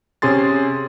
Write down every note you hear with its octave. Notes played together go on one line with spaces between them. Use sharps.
C3 C#4 G#4 C6 A6